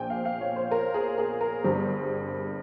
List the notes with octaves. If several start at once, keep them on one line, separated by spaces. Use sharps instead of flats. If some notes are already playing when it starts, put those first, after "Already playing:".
Already playing: A#1 A#2 F3 C4 G5 G#5
F5
F5
C#5
C5
A#4
G#4
G#4
A#4
G1 G2 G3 C4 G#4